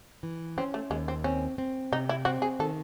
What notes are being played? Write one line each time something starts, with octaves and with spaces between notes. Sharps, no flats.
E3
C4 C#4
A3
D#2 G#3
C4
C4 C#4
C4
C3 D#4
E4
C4 F#4
G#4
D#3 A4